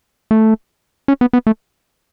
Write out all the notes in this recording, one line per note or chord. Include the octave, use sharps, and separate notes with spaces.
A3
C#4
B3
B3
A3